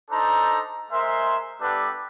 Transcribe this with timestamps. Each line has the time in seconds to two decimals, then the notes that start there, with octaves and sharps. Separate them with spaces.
0.11 D4 D#4 A4 C5 A#5
0.91 G#3 A#4 C5 E5 G#5 C6
1.60 G3 B3 D4 G4 A4 B4